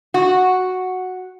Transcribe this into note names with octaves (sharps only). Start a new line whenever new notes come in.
F#4